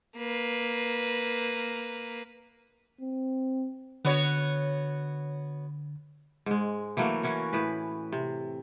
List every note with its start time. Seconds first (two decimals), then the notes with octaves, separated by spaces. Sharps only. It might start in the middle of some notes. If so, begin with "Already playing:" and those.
0.17 A#3 B4
3.01 C4
4.05 D3 B3 F#4 C#5
6.46 G#2 G#3
6.97 E3 F#3 A3 A#3
7.23 E3 C#4 F#4
7.53 A2 B4
8.12 C3